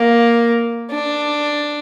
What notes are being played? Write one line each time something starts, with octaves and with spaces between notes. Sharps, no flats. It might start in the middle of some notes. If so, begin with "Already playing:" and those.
Already playing: A#3
D4